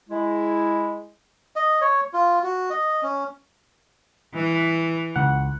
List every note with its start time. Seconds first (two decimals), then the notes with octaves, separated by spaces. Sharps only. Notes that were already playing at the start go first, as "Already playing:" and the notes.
0.09 G#3 E4
1.56 D#5
1.81 C#5
2.13 F4
2.43 F#4
2.70 D#5
3.03 C#4
4.34 E3
5.16 C#2 F#5